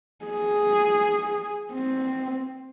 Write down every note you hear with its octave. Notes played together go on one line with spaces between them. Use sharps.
G#4
C4